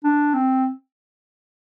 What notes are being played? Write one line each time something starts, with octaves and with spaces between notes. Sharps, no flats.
D4
C4